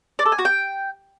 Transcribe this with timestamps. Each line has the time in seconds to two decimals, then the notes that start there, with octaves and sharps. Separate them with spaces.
0.19 D5
0.25 A4
0.32 G#5
0.38 F#4
0.45 G5